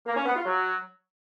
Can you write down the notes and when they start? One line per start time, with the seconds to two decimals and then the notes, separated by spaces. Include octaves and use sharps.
0.06 A#3
0.16 C#4
0.26 B3
0.35 F4
0.45 F#3